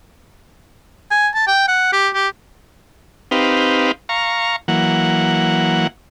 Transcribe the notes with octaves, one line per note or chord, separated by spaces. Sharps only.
G#5
A5
G5
F#5
G4
G4
C4 D#4 G4 B4 F5
F5 A#5 C#6
E3 F#3 A#3 F#5